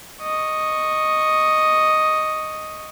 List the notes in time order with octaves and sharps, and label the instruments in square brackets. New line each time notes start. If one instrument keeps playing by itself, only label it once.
[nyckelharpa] D#5 C#6